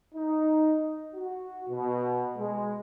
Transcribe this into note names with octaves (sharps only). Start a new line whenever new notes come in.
D#4
F#4
B2
G#3